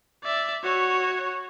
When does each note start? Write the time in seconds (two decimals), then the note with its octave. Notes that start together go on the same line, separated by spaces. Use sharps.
0.23 D5 E5
0.64 F#4 C#5